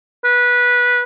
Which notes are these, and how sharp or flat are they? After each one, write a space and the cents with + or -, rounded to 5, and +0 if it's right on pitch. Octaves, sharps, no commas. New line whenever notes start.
B4 -15